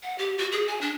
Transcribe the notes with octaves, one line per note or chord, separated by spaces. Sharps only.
F#5
G4
F#4
G#4
G#5
D4